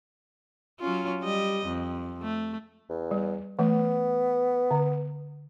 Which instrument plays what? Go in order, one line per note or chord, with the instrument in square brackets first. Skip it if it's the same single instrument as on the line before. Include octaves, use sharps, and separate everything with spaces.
[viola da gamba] F#3 C#4 F4
G3 D#5
F2
A3
[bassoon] E2
[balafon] G3
[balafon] E3 A3 [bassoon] B3
[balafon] D3